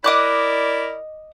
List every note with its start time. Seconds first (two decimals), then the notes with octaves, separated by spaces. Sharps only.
0.04 E4 A#4 D5 D#5 D6 F#6